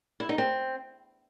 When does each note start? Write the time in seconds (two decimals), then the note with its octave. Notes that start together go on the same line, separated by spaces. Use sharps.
0.20 E4
0.29 D#4
0.38 C4